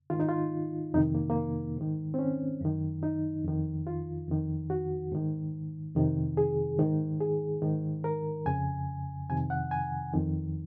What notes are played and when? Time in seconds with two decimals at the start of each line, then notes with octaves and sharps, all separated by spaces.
0.10 G#2 D#3 F4
0.20 D#4
0.29 F4
0.94 F2 C3 D#3 D#4
1.15 A#3
1.30 A#3
1.77 G#2 D#3
2.14 C4
2.19 C#4
2.61 F#2 D#3
3.03 D#4
3.44 F2 D#3
3.87 F4
4.28 F2 D#3
4.70 F#4
5.12 G#2 D#3
5.95 F2 C3 D#3
6.37 G#4
6.79 G#2 D#3
7.20 G#4
7.62 G#2 D#3
8.04 A#4
8.46 F2 C#3 G#5
9.30 F2 C3 D#3 G#5
9.50 F#5
9.71 G#5
10.14 F2 D#3